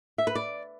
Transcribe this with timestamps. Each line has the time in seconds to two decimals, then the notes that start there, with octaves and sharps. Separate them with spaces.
0.18 E5
0.27 B4
0.35 D5